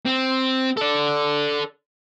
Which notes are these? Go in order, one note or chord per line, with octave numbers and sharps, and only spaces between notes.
C4
A4 D5